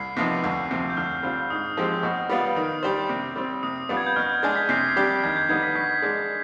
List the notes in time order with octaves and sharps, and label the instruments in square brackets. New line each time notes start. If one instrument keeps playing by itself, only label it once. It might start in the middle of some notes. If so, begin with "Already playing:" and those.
Already playing: [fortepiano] C2 [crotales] C7
[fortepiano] C3 F3 B3 D#4
D2
C3 F3
[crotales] G6
[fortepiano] D2 [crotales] F6
[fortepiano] D3 G3 C4 F4
[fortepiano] G#2 [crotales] D#6
[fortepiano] F3 G#3 C4 G4
B2
G3 B3 F4
[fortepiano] D#3 [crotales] D#6
[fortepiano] G3 D4 G4 C5
C3
G3 C4
[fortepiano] C3 [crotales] D#6
[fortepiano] G3 B3 D4 F4
[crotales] G#6
G6
[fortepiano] B2 [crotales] F6
[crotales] G6
[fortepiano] G#3 D4 G#4 [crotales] G#6
[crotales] B6
[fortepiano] C3 [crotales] C7
[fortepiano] G3 D4 G4
[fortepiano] D#2 [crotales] G#6
[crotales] G6
[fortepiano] D3 G3 B3 D#4 [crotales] G#6
[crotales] B6
[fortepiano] B2 [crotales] B6
[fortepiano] G#3 D4